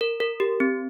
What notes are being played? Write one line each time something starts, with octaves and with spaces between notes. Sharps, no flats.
A#4
A#4
G4
C4